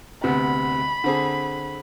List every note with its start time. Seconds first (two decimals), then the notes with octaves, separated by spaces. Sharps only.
0.23 D2 C3 B3 B5
1.04 D3 C4 G#4